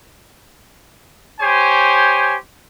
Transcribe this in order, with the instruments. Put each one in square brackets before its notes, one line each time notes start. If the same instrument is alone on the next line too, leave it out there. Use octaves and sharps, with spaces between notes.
[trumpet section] G4 C5 C#5 G#5